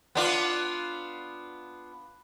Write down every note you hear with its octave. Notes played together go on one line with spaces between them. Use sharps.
B3 D4 F4